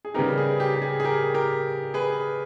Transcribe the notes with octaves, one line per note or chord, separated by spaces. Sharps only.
G#4
C#3 G3 B3 D#4 G4 A#4
G#4
G4
G4
G#4
G#4
G4 A#4
G4 A#4
G#4 B4